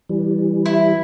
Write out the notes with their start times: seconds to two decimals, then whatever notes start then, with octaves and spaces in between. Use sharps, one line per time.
0.09 E3 G3
0.66 E4